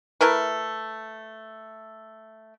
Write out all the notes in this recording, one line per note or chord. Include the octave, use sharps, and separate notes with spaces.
A3 E4 A#4 B4